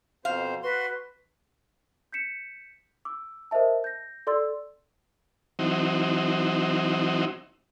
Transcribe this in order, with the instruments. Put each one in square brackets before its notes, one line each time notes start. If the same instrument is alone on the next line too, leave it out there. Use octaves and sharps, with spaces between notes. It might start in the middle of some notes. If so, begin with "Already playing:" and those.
[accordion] F2 B2 C5 [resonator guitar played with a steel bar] F5
[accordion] F#4 C6 [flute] B4
[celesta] G6 B6 C#7 E7
D6 E6
A#4 C5 D#5 E5 A5
G6 A#6
A4 D5 C6 E6 A6
[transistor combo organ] E3 F#3 C4 D#4